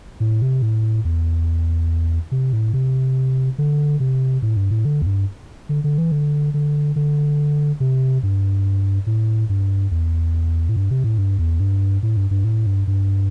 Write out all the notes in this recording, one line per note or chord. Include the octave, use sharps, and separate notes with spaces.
A2
C3
A2
E2
C3
A2
C3
D3
C3
A2
G2
A2
D3
E2
G2
D3
D3
E3
D3
D3
D3
C3
G2
A2
G2
E2
A2
G2
C3
A2
G2
E2
G2
A2
G2
G2
A2
G2
G2